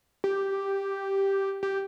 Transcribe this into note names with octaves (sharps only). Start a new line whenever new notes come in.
G4
G4